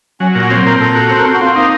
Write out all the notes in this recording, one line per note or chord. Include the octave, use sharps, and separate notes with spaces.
F#3 C#4
A#2
F#4
C4 C#5
A#2 A#4
A#2 A4
F#4
C4 C5
A#4
C4 A4
F#4
C4 F4
A#3 D#4